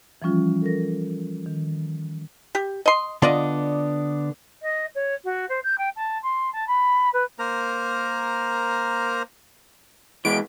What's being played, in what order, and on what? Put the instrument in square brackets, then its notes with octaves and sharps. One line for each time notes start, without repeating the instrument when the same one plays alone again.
[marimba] E3 F3 G3 C#4 F4
A4 A#4 A#6
D#3
[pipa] G4
D#5 C6
[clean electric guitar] D3 B3 D4 [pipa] F4 D5 D#5
[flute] D#5
C#5
F#4
C5
G6
G5
A5
C6
A5
B5
B4
[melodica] A#3 A#4 C5 A#5
[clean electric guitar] E3 G#3 B3 [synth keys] D7